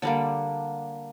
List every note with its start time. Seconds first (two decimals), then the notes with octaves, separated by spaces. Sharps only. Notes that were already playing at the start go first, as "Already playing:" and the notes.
0.02 D3 G3 A#3 D4